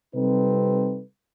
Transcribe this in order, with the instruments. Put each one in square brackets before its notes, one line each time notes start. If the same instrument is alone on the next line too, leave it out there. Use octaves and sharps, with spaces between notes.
[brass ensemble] C3 G3 C4 D#4 A4 B4